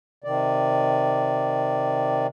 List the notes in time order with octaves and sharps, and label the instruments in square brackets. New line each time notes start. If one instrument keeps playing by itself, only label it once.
[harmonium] C3 D#3 D5